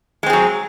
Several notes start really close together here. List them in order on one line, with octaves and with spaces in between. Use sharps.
G#3 C4 G#4 F#3